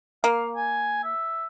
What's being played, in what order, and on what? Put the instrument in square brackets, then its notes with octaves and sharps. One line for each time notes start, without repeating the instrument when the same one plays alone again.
[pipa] A#3 [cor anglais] F5
[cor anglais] G#5
E5